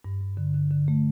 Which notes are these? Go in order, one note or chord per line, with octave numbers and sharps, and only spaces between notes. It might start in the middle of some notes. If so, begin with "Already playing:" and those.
G2
G2
D3
D3
D3
A3